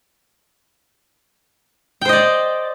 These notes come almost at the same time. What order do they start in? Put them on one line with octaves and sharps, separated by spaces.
G5 C5 D#5 D5